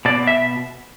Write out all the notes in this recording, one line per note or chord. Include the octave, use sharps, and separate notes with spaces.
B2 D5
E5